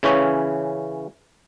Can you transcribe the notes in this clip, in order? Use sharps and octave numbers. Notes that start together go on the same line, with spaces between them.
C#3 E3 C#4 C#5